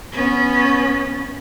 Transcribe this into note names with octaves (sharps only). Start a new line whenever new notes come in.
B3 C#4